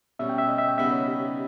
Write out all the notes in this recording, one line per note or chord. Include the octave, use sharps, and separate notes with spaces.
B2 G3 C#4 E5
G5
E5
D#5
E5
G5
C#3 G3 B3 D#4 E5
C#5
G4